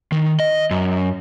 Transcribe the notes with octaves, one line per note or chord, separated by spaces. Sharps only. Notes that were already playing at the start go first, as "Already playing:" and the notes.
D#3
D#5
F#2